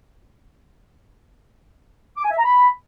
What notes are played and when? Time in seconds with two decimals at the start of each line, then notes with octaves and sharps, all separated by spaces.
2.17 D6
2.24 G#5
2.31 E5
2.38 A#5
2.44 B5